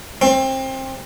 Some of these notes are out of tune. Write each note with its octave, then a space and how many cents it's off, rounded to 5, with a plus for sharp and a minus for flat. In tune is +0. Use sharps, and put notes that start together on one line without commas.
C4 +25